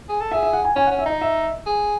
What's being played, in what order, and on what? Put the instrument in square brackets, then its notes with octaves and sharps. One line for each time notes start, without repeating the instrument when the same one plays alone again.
[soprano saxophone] G#4
A4
[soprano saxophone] G#4 [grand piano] E5
[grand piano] E5
F#5
G#5
[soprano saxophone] C#4 [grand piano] G#5
[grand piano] F#5
[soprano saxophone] C#4
[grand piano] E5
[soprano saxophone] D#4 [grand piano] D#5
[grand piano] E5
[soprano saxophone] G#4